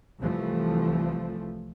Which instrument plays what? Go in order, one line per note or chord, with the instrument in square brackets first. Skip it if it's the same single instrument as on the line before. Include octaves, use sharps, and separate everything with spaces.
[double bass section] C2 E3 F3 A3